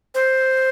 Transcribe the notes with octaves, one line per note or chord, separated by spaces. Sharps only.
C5